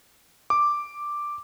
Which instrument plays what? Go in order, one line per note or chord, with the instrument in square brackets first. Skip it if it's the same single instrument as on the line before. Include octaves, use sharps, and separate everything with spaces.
[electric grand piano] D6